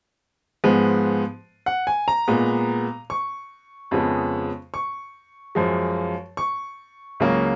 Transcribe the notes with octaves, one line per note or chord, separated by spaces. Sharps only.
G#2 F3 G#3 B3
F#5
G#5
A#5
A#2 G#3 B3
C#6
F2 C#3 G#3 B3
C#6
F#2 F3 G#3
C#6
C#2 C#3 F#3 A#3